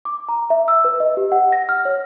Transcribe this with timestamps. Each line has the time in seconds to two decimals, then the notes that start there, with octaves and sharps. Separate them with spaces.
0.05 D6
0.28 A#5
0.50 E5
0.68 E6
0.85 B4
1.00 D#5
1.17 G4
1.32 F#5
1.52 A#6
1.69 F6
1.85 C#5